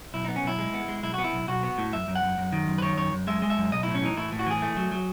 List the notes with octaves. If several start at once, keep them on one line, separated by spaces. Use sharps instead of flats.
B1 E4
B3 D#4
C#4
B1 E4
G#3
B3
G#3
B1 E4
B3 F#4
E4
B1
B1 F#4
B3
A2
F#2 E5
F#2
F#5
F#2
F#2
D#3
F#2
B4
D#3 C#5
F#2 C#5
F#2
G#3 E5
G#3
E5
F#2
B1 D#5
A2 E4
C#4
E3 D#4
A2 E4
A2
F#4
E3 G#4
A3
F#3
F#3